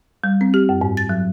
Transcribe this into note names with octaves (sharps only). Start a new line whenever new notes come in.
G3
C4
G4
F#2
G#2
A6
F#3